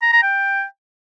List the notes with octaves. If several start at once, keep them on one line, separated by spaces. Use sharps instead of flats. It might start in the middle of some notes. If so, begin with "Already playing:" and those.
A#5
A#5
G5